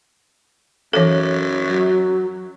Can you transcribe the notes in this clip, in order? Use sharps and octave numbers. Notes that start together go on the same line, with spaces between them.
F#2 E3 A4
F#3